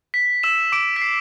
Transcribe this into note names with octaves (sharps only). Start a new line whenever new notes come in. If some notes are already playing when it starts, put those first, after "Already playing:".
B6
E6 E7
D6 D7
B6
C7